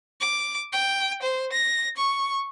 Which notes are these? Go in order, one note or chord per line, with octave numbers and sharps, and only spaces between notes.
D6
G5
C5
A#6
C#6